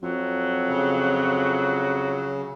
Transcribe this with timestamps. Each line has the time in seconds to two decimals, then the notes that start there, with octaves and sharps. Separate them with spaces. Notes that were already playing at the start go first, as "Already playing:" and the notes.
0.02 F2 F#3
0.69 C#3